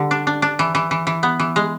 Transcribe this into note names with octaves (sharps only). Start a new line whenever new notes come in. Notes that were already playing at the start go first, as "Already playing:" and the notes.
Already playing: D3 G3
D4
D4
D4
E3
E3
E3
E3
B3
E3
G#3